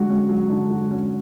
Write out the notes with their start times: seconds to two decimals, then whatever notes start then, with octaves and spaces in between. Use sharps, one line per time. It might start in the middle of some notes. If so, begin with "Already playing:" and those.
Already playing: D3 F#3 G#3 F#4
0.09 C#4
0.29 F#3
0.50 D3
0.71 F#4
0.91 C#4